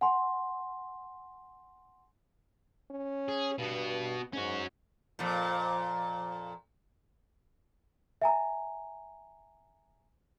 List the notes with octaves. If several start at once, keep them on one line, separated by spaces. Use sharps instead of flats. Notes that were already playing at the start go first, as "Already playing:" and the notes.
F#5 G#5 C6
C#4
G#4
G2 B2 B3
G#2 C#4 F#4
F2 A#2
E5 G#5 A#5